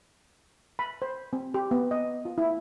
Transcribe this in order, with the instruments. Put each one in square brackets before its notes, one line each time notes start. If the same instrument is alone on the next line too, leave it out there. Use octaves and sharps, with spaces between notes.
[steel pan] B5
C5
C4
G4
B3
D#5
F4
E4